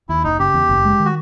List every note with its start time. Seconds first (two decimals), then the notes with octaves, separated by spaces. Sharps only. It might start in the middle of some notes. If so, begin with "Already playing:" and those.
0.09 D#2 E4
0.24 F#1 D#4
0.39 C#3 G4
0.54 E2
0.69 F#1
0.85 G#3
1.00 D#3
1.05 F#4